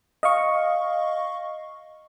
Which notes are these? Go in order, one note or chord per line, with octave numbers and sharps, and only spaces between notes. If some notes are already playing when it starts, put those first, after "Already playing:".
D#5 F5 C#6